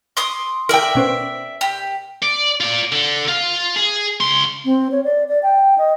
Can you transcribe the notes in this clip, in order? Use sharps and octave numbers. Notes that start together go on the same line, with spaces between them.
C6 D6 D#6
A#4 D5 E5 G5 A#6
B2 C#4 C5
G4
D5
F4 D5
D3
F4
G#4
C#2 C6
C4
C#5
D5
D5
G5
D#5